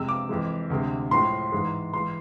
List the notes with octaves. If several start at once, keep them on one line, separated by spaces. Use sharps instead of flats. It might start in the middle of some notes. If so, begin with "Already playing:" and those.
Already playing: F2 C3 G#3 E6
D6
F2 E3 G#3
D2 C3 G#3
A2 F3 G#3 C6
G#2 E3 G#3
E3 G#3 C6